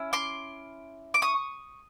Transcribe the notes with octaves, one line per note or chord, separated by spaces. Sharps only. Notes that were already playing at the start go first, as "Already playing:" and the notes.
Already playing: C#4 E4
C6 D6
D6
C#6 D#6